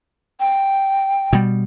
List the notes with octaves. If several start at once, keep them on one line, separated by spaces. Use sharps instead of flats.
G5
B2 G3